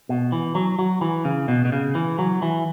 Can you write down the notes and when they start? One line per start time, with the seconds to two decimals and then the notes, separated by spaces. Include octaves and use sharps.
0.09 B2
0.32 E3
0.55 F#3
0.79 F#3
1.01 E3
1.25 C#3
1.48 B2
1.65 B2
1.72 C#3
1.95 E3
2.19 F#3
2.42 E3